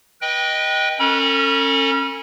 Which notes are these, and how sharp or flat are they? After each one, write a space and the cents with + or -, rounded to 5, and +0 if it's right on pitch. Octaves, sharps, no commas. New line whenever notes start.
B4 -30 D#5 +0 G5 +0
C#4 -15 A4 +40 B5 -40